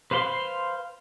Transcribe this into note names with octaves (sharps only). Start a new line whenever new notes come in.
B4 C5 F5 B5 C6